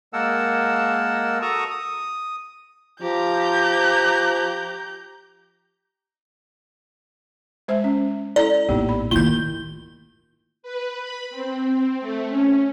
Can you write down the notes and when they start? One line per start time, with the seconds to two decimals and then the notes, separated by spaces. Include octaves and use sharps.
0.13 G#3 A#3 A#4 F#5 A5 E6
1.42 F#4 A4 A5 A#5 C#6 D#6
1.70 D#6
3.02 F3 G4 A#5 G6
7.68 G#3 C5 E5
7.84 C#4
8.36 E4 A4 D5 A#5
8.69 A#1 A2 B3 D#4 G4
8.89 B5
9.11 A2 D#3 A#3 E4 F4 G6 G7
10.63 B4
11.01 B5
11.31 C4
12.01 A3
12.29 C#4